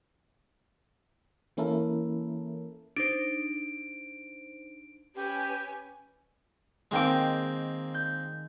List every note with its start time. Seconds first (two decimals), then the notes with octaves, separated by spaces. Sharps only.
1.57 E3 A#3 C#4 E4 A4 A#4
2.97 D4 D#4 C5 D7
5.15 C#4 G4 B4 G#5
6.91 D#3 G#3 A#3 C4 G5 D6
7.94 G6